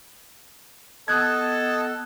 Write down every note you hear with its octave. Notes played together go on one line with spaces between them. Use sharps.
B3 A4 D#5 A5 D#6 F#6 G#6